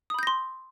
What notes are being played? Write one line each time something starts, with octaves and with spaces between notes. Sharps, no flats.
B5 C6 D#6 G6 A#6